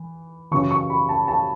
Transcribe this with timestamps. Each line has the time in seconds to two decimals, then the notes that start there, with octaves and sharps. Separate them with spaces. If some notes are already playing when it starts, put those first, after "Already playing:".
Already playing: E3
0.51 F#2 C#3 E3 C#6
0.71 C#6
0.90 B5
1.09 A5
1.28 A5